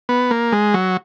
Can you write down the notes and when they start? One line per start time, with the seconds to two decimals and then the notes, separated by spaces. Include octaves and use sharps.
0.09 B3
0.31 A#3
0.52 G#3
0.74 F#3